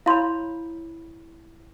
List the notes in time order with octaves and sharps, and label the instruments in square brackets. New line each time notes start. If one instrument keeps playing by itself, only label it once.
[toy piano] E4 C#5 B5 [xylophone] F5 C6